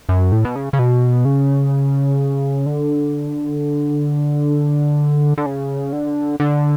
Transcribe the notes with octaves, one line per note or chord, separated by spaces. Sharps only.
F#2
A2
B2
C#3
C#3
B2
C#3
D3
D3
C#3
D3
D3